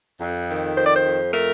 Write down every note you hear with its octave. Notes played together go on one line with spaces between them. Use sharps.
F2
D#3
F2 C5
D5
C5
F2
A3 A#4